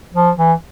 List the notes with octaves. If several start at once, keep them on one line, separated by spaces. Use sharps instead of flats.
F3
E3